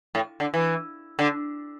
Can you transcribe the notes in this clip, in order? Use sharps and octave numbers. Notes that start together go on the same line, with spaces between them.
A2
D3
E3
D3